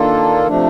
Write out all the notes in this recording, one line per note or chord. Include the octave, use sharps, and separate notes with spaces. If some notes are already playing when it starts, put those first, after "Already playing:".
Already playing: D#3 A#3 D4 F4 A4
C3 F3 A3 D4